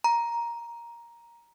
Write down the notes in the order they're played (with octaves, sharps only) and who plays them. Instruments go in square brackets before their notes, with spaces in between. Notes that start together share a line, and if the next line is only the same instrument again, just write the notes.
[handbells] A#5